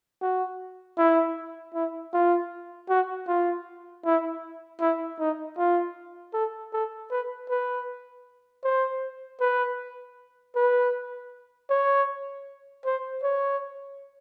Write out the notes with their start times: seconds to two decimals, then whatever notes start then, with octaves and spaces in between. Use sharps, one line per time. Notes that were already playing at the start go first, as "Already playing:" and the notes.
0.21 F#4
0.98 E4
1.74 E4
2.13 F4
2.89 F#4
3.28 F4
4.05 E4
4.80 E4
5.19 D#4
5.58 F4
6.34 A4
6.73 A4
7.10 B4
7.49 B4
8.64 C5
9.41 B4
10.56 B4
11.70 C#5
12.85 C5
13.23 C#5